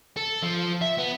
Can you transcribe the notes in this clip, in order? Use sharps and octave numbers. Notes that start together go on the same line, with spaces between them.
A4
F3
E5
B3